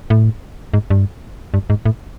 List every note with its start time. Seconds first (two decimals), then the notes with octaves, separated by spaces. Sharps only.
0.10 A2
0.74 G#2
0.90 G2
1.54 G2
1.70 G#2
1.85 A2